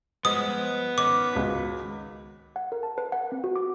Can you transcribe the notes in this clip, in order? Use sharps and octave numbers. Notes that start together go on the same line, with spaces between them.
F3 G#3 B3 B4 D#6
D#3 C#4 D6
C#2 F#4 B6
F#5
A#4
A5
B4
F#5
C4
F#4
D6